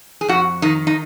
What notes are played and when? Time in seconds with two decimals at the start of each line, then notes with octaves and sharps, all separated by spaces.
0.21 G#4
0.28 F2 F#4
0.62 D#3 D#4
0.87 D#4